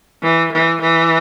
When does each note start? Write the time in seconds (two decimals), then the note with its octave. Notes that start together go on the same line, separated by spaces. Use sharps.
0.23 E3
0.52 E3
0.81 E3